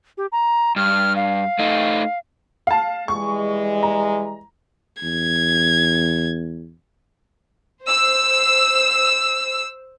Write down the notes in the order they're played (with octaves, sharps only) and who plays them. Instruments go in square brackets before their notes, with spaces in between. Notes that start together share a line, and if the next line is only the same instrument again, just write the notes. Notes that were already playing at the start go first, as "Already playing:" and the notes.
[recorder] G4
A#5
[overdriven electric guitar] G2 [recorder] F6
[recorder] F5
[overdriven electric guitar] A3 D#4
[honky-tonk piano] F5 A5
[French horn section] E3 G3 G#3 [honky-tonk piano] C#6
[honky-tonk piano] A#5
[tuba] E2 [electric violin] G#6
[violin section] C5 E6